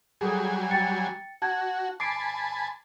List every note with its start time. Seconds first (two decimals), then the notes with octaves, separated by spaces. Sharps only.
0.21 F#3 G3 G#4 A4 G#5
0.71 G5 A6 C#7
1.42 F#4 A5 G#6
2.00 G#5 A5 B5 D6 C7 D7